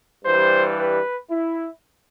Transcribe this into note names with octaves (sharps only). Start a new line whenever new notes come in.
G2 E3 G3 C5
B4
E4